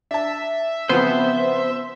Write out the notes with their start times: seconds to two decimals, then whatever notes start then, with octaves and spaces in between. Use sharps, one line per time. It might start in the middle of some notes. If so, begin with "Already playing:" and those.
0.11 D4 E5 A5
0.89 C#3 F3 B3 C4 C5